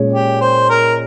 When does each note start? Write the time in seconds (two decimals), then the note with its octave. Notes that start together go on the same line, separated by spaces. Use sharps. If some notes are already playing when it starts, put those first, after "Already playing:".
Already playing: A#2 G#3 C#4 G#4 C#5
0.12 G4
0.41 C5
0.69 A#4